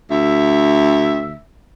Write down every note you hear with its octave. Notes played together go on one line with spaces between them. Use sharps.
D2 E5